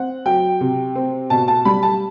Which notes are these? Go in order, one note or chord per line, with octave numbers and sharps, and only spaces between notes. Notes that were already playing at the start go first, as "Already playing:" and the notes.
Already playing: C4 F#5
F#3 G5
C3
C4
B2 A5
A5
G3 B5
A5